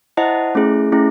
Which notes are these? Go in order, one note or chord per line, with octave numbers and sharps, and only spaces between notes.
E4 C5 D#5 F#5 A5
A3 C#4 E4 G#4
A3 C#4 E4 G#4